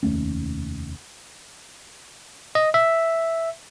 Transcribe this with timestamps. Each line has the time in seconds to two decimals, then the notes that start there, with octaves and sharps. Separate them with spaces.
0.03 F1 D#2 A3 C#4
2.55 D#5
2.74 E5